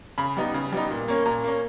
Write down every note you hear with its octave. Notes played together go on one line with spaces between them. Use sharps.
C#3 B5
G3 B3 D#4
C#3
G3 B3 D#4
A#2
A#3 C#4
A#2 A#5
A#3 C#4